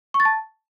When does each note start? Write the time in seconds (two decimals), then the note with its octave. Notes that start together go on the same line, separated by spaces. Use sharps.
0.14 C#6
0.20 A6
0.25 A5